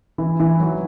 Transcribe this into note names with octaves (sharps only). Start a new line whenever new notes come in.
E3 E4
E3 E4
F#3 F#4